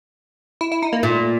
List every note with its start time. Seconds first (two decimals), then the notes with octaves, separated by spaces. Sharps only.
0.61 E4
0.72 E4
0.82 D#4
0.93 A#3
1.03 A#2 A3